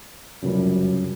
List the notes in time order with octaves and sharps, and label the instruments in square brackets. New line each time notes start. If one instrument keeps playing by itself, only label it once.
[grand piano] F1 C#2 G3 [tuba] F#2